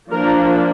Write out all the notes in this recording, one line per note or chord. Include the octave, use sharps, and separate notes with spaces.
F3 A#3 D4 A#4